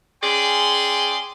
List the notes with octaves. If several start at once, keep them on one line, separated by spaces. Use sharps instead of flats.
C#4 G#4 D5 G5 C6